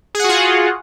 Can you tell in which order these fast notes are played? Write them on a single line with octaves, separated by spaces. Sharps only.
G#4 F#5 F#4 F4